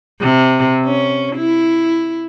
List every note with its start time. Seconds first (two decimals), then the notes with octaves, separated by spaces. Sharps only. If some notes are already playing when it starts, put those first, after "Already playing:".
0.21 C3
0.85 C#4
1.36 E4